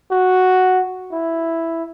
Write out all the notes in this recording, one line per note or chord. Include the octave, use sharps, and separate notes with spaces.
F#4
E4